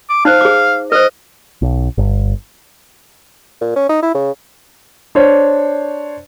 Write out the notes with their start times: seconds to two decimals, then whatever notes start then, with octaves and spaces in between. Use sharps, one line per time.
0.09 D6
0.25 D#4 C5 F5
0.41 G#4 D6
0.92 B4 C5 D#5
1.62 B1
1.98 G1
3.61 A#2
3.76 C#4
3.89 D#4
4.03 E4
4.15 C#3
5.15 D4 C5 C#5